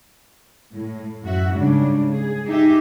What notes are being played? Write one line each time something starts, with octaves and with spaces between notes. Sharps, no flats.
A2
F#2 F3 F#4 E5
G#2 C#3 G3 G#3 D4
G#4
D#4 G4 G#4 D#5 E5